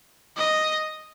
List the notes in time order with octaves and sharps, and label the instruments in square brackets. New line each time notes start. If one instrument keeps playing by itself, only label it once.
[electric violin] D#5